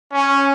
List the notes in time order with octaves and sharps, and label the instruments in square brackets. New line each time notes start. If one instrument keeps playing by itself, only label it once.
[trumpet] C#4